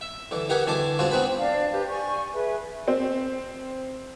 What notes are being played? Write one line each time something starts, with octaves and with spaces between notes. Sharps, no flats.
E5
D3 E3
D#4 G4 A#4 B4 F#5 G#5
D2 E3 G#5 A5 C6 D6
G#3 C4 D4 F4 F#4
B3 C4 G#4 B4 C5 B5
D4 F5
G4 B4
D5 G#5 C#6
G#4 B4 E5
C4